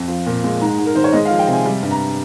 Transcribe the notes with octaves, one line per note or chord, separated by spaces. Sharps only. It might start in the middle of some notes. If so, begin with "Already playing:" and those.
Already playing: F2
F3
A#2
G#3
G#2 A#5
G#2
A#4
D#3 C5
C#5
G#3 D#5
F5
F3
G5
C3
G#5
G3
G2
A#5